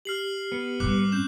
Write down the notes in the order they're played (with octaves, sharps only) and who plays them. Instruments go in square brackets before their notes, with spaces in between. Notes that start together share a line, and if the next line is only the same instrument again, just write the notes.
[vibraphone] G4 [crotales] F6 C7 F#7
[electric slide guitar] B3
[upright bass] G#2 G3 [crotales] D6 F#6
[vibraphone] C4 C#4 [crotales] G6 E7